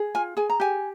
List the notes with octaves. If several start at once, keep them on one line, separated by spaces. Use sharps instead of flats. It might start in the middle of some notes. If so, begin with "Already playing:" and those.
Already playing: G#4
F4 G#5
G#4 G#5
A#5
G4 G#5